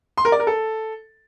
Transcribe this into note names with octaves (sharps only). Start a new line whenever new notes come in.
C6
A#4
D5
A#4
A4